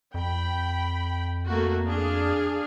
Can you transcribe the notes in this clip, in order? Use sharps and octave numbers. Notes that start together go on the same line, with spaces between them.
F2 G5 B5
A3 A#3 F#4
D4 G#4 F5